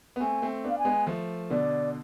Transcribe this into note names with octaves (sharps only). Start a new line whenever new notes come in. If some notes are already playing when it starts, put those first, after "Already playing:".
B3
A3 C4 G#5
A3 C4
B3 D4
F5
G#5
G#3 B3
F3 A3
B2 D3 D5